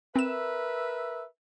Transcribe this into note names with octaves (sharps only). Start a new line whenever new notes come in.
C4 A#4 B4 E5 E7